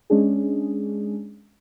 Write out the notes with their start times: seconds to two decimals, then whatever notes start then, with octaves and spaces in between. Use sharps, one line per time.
0.10 G#3 C#4 D4 G#4